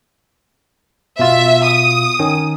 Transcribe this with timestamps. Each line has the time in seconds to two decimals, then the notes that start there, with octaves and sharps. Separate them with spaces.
1.19 B2 F4 E5
1.66 D#6
2.19 D#3 C#4